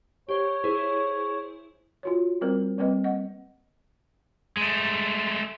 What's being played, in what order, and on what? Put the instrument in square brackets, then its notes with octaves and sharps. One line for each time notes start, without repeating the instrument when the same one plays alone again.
[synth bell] G4 C5 [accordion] C#5
[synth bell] E4 G#4 C5
[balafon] F4 F#4 C#5
G3 C4 A#4 C5
G3 A#3 C4 B4 D#5
D#5 F#5
[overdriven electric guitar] G#3 A3